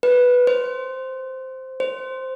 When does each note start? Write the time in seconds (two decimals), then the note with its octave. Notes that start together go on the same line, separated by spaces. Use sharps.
0.03 B4
0.47 C5
1.80 C5